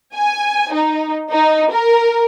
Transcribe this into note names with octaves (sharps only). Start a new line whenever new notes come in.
G#5
D#4
D#4
A#4